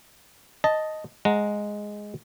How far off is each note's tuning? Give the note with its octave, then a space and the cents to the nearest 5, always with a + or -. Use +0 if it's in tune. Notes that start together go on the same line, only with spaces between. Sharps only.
D#5 +0 A5 +0
G#3 +0 F#5 -20 A#5 +0